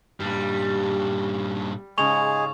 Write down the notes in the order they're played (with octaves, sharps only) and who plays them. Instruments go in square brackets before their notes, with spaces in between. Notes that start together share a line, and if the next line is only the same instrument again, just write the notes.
[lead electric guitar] G2 A#2 [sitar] G3
[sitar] G#2 C#3 [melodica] G#3 G#4 [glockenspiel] C#6 F7